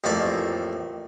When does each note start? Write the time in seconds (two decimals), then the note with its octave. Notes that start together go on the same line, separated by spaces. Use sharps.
0.04 A1 F2 A3 A#3 D5 A5